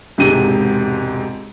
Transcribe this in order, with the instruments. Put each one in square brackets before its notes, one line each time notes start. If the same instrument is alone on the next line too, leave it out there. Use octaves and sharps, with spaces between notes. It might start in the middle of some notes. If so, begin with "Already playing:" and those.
[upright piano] E1 G#2 C3 D#7